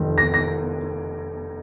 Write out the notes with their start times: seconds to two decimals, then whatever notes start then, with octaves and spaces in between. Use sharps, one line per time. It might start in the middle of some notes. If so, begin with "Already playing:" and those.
Already playing: F1 F2 D#3
0.18 A#6
0.34 A#6